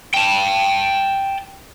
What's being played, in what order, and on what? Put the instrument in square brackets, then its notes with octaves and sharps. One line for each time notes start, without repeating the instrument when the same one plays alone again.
[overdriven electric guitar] G5 A5